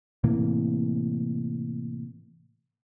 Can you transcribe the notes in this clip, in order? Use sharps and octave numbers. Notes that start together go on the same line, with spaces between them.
A2 C3 E3 A#3